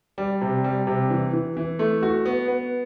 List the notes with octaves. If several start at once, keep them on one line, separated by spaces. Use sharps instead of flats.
G3
C3
G3
C3
E3
E3
E3
A3
F#4
B3
B3